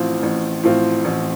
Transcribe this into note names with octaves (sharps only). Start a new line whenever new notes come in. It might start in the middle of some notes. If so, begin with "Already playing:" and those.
Already playing: A1 A2 F3 C4 F4
A1
A2 F3 C4 F4
A1